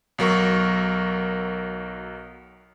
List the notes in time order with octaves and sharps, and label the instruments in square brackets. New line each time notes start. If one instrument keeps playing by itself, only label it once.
[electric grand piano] B1 F#3 A#4 C#6